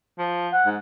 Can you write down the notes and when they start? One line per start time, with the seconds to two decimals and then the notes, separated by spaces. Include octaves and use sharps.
0.18 F3
0.52 F#5
0.66 G#2